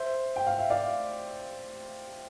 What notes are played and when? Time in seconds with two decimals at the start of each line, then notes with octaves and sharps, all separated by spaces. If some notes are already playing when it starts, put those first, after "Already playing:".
Already playing: C5 E5
0.36 G5
0.47 F5
0.58 E5
0.70 D5 F5